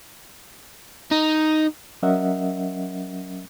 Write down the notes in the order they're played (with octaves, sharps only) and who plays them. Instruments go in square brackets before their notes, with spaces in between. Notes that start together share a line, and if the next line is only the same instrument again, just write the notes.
[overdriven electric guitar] D#4
[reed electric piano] F#3 C#4 A#4 D#5 E5 F#5